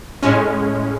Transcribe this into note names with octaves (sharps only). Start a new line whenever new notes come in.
A2 G#3 C#4